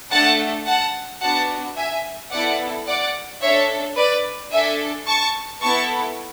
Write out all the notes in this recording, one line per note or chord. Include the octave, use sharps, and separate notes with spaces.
A3 D4 A4 F#5 A5
F#5 A5
B3 D4 F#4 F#5 A5
E5 G#5
B3 E4 A4 D5 F#5
D5 F#5
D4 A4 C#5 E5
B4 D5
D4 A4 E5 G#5
A5 C#6
B3 E4 A4 A5 C#6